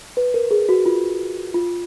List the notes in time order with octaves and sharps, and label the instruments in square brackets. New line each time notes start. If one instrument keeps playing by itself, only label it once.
[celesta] B4
A#4
G#4
F#4
F4
F4